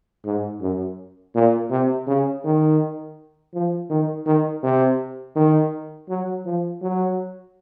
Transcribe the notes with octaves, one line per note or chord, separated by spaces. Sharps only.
G#2
F#2
A#2
C3
C#3
D#3
F3
D#3
D#3
C3
D#3
F#3
F3
F#3